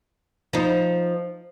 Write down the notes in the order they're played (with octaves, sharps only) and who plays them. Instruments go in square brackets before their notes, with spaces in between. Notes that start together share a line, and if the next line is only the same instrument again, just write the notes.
[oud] F3 D#4